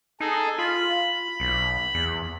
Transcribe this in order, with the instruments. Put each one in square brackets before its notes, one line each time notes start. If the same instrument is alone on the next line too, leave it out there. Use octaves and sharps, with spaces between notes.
[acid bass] D#4 [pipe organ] G#4 A4
[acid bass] F4 [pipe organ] B5
[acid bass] B1
E2